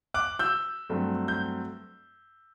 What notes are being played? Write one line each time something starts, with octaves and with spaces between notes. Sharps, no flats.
D6 F#6
E6 G6
G2 F#3 A3 C4
G6